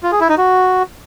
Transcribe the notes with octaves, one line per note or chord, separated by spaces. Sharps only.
F4
G#4
E4
D#4
F#4